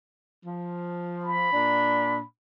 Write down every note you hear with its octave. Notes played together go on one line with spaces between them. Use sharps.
F3
B5
A#2 D4